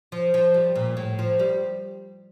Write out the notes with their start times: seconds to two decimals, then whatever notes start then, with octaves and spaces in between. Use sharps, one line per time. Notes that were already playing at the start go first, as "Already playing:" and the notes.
0.12 F3
0.34 F3
0.54 G3
0.75 A#2
0.97 A2
1.19 F3
1.39 G3